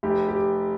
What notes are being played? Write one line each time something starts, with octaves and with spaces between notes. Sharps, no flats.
F1 G4
G4